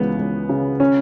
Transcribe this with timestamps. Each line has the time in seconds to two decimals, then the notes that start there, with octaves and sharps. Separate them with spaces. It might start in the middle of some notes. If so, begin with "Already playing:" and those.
Already playing: C#2 E3 B3
0.19 C#2
0.49 C#3
0.80 C#4